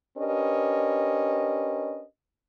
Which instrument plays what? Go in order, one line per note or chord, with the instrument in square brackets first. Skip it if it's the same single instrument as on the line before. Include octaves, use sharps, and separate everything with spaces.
[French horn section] C#4 D4 G4 A#4 B4 D#5